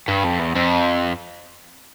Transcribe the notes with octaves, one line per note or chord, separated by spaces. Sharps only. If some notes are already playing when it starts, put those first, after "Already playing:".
G2
F2
E2
F2